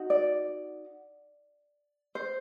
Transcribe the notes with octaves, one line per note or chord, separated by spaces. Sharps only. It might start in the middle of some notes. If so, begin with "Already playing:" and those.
Already playing: D#4 F#4
D5
C5